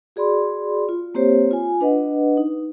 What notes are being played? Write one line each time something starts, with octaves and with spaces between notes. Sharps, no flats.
F#4 G#4 D5 B5 C6
F4
A#3 C4 G4 C5 C#5
F4 G#5
D4 B4 D#5 F#5
D#4